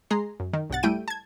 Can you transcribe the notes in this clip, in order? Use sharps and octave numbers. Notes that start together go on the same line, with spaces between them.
G#3 G#4 A#5 C6 C7
F#2
D#3
B1 G2 F#5 A6
G3 A3 E4 G5 D7 D#7
A5 G#6